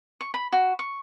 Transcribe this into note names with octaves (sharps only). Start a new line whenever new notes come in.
C#6
B5
F#4
C#6